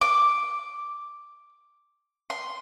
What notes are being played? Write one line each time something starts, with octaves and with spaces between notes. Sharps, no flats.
D6
C6